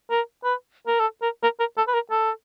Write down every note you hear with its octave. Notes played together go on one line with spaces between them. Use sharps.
A#4
B4
A#4
A4
A#4
A#4
A#4
A4
B4
A#4
A4